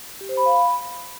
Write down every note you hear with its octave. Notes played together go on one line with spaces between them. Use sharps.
G4
C5
B5
F5
B5